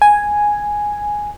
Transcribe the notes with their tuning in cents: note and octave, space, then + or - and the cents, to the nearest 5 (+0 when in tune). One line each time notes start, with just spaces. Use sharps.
G#5 +0